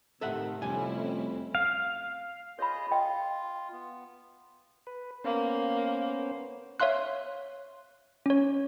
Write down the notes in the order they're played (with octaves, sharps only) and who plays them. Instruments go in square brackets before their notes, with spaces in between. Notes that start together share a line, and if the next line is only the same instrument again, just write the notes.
[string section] A2 D#3 C4 [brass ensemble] C3 [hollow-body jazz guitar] A4 E5 F#5
[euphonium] F2 [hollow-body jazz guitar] C3 G#5 [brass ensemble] G3 A3 [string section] C4 C#4 E4
[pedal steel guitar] F5
[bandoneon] F4 G#4 D#5 [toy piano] C#5 B5
[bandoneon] F4 [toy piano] D#5 G5
[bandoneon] B3
[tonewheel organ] B4
[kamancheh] A#3 [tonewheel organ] B3 C#4 C5
[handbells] C#5 E5 F5 C6 F#6
C#4 C#5